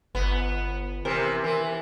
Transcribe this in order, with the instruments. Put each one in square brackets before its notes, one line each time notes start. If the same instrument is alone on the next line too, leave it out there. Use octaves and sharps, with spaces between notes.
[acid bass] G1 [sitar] B3
[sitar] C3 E3 [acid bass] A#4
[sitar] E3